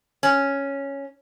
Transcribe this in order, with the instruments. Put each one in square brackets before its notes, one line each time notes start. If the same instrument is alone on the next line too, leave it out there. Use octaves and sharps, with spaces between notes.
[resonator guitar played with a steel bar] C#4